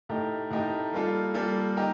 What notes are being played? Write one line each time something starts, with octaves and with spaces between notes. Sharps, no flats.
A2 A3 D#4 G4 A#4
A2 A3 D#4 G4 A#4
G3 A#3 F4 A4
G3 A#3 F4 A4
D#4 G4 A#4